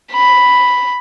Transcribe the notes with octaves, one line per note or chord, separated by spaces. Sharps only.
B5